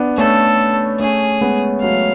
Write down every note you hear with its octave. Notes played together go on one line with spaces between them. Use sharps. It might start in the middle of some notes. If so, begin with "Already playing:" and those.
Already playing: B3 D4
A3 C#4 A4
A3 C#4 G#4
G#3 B3
F#3 A3 F5